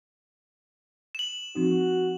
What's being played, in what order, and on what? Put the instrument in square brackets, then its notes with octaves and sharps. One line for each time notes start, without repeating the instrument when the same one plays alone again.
[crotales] E7 F#7
[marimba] F3 C4 D#4 [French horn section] F#4